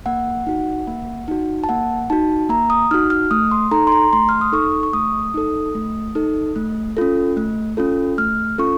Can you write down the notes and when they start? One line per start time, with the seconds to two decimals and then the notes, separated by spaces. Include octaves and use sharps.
0.06 A#3 F#5
0.47 D#4 F#4
0.87 A#3
1.28 D#4 F#4
1.64 A5
1.69 A#3 F#5
2.10 D#4 F#4 A5
2.49 A#3 A#5
2.70 D#6
2.91 D#4 F#4 F6
3.10 F6
3.31 A3 D#6
3.51 C6
3.71 D#4 A4 A#5
3.87 C6
3.92 A#5
4.13 A3 C6
4.29 F6
4.41 D#6
4.52 D#4 A4 C#6
4.83 C#6
4.93 A3 D#6
5.34 D#4 A4
5.75 A3
6.15 D#4 A4
6.56 A3
6.97 C#4 F4 A4
7.37 A3
7.77 C#4 F4 A4
8.18 A3 F6
8.58 C#4 F4 A4 C#6